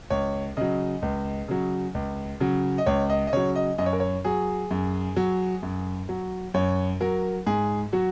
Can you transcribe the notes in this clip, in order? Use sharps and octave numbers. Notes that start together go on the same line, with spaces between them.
C#2 C#5
C#3 F#3 D#5
C#2
C#3 F#3
C#2
C#3 F#3
D#5
C#2 C#5
D#5
D#5
C#3 F#3 C#5
D#5
F#2 D#5
C#5
A#4
C#5
F#3 G#4
F#2
F#3
F#2
F#3
F#2 C#5
F#3 A#4
G#2 G#4
F#3 F#4